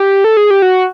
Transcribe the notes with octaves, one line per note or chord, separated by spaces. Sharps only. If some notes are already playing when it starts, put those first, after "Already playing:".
Already playing: G4
A4
G#4
G4
F#4